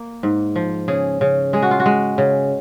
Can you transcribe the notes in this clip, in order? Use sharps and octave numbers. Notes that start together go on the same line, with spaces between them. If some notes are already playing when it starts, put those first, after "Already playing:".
Already playing: A#3
G#2
F3
C#3 G#4
C#3
G#3 G#4
F#4
F4
F#4
G#3
C#3